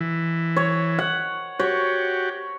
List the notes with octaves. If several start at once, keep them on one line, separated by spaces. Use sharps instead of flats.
E3
C#5
F#5
F#4 G4 C#5